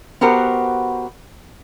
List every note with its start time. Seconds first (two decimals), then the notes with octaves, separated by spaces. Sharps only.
0.21 B3 F#4 G4 A#4 C5 F#5